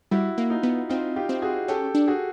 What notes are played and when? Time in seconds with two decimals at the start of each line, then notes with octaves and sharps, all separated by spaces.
0.11 G3 E4 F#4
0.38 A#3
0.50 D#4 F4
0.63 B3
0.89 C4 D#4 F4
1.16 F4 G4
1.29 C4
1.42 F#4 G#4
1.68 C#4 G4 A4
1.94 D4
2.08 F#4 G#4